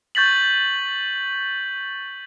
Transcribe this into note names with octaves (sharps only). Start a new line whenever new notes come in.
C#6 G6 A6 B6 F#7